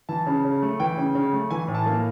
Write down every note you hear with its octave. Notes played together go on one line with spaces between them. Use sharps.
E3 A5
C#3
C#3
A3
E3 G5
C#3
C#3
A3
E3 G#5
A2
A5
A#3